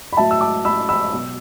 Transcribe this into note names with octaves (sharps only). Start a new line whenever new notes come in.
B5
A2 F#3 E5 A5
E6
A5 D6
A2 F#3 B5 E6
B5 E6
B2 F#3